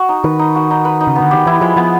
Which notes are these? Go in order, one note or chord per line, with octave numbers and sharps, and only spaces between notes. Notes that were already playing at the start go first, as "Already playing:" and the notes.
Already playing: F#4
D#4
D#3 B4
D#4
F#4
D#4
B4
D#4
C#3
D3 B3
D#3 G4
E3 E4
F3 G#3
F3 B3